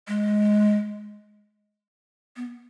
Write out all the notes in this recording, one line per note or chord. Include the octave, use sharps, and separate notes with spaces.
G#3
B3